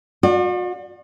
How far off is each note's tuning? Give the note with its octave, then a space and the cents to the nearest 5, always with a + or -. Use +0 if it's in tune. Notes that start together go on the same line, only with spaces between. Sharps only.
F#4 -45 D5 +45